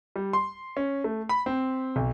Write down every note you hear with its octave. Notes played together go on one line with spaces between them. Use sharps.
G3
C6
C#4
A3
B5
C4
B1